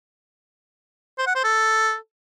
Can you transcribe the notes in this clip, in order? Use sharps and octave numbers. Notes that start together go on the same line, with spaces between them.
C5
F#5
C5
A4